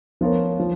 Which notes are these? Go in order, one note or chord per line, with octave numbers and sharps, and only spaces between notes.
F3 B3 F4 A#4 C#5
F3